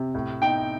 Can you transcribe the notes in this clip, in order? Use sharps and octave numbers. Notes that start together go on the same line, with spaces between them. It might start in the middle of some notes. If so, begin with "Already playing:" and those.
Already playing: C3
A2
D#4 G5